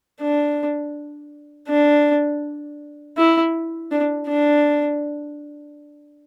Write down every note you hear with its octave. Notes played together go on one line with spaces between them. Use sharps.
D4
D4
E4
D4
D4